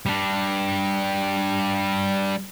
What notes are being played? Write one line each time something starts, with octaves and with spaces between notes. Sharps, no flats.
G3 D4